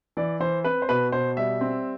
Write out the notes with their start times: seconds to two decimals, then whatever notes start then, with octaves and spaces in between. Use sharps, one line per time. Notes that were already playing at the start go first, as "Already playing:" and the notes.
0.17 E3 D5
0.40 E3 C5
0.64 C4 B4
0.82 C5
0.89 B2 B4
1.12 B2 C5
1.37 G3 E5
1.61 C4